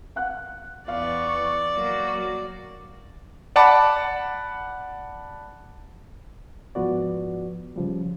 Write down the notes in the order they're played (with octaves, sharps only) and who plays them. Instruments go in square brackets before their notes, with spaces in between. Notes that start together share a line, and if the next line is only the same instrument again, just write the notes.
[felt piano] F5 F#5 F#6
[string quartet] E2 B3 C#6 [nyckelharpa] D5 [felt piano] F5
[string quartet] F#3 A#3 F#4
[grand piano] D5 F#5 A5 B5 D6
[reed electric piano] G#2 F3 B3 F#4 D5
C#3 F3 G3